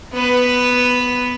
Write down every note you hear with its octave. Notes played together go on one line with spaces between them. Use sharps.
B3 B4